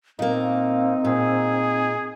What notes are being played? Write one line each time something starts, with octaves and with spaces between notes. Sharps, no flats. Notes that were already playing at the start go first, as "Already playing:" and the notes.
A#2 A#3 C4 D#4
A#2 G#4